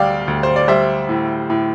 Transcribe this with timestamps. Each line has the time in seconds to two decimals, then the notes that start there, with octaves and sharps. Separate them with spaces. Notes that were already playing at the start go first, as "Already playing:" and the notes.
Already playing: D2 G3 D5 F5 G5
0.28 D2
0.43 C5
0.56 D5
0.68 G3 C5 E5
1.09 A2
1.50 A2